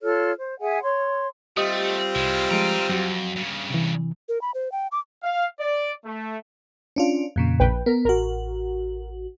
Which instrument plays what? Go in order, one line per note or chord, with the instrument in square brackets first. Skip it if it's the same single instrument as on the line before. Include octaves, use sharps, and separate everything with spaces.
[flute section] F4 A4 C#5 F6
C5
G#4 E5 F#5 G#5
C#5 C6
[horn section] G3 C4 F4 [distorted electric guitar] A3 [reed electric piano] G4 D#5 D#6
[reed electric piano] C2 [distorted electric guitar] G#3 E4
[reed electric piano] F3 G#3 [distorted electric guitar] G5 A#5
[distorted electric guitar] F2 [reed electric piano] F#3 F#4
[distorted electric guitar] G2 C#3
[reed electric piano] C3 E3
[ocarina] A#4
B5
C5
G5
D6
[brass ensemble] F5
D5
A3
[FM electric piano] C#4 D4 F4
F2 A#2 C#3
[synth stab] A#1 B4 G5
[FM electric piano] B3 [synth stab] A#4
[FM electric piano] A1 F#4 [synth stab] A#4